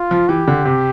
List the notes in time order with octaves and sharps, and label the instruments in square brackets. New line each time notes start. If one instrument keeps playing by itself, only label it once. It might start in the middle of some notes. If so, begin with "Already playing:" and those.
Already playing: [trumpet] F4
[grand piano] F3
[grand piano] E3 [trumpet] G4
[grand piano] D3
C3